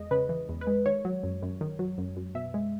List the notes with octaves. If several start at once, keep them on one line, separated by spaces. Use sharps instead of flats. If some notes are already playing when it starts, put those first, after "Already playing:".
Already playing: E2 G#3 D#5
C#3 B4
E3
E2
B4
G#3
D#3 C#5
F#3
F#2
F#2
D#3
F#3
F#2
F#2
B2 E5
G#3